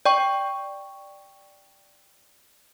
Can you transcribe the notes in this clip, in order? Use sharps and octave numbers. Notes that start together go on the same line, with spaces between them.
D5 G5 C#6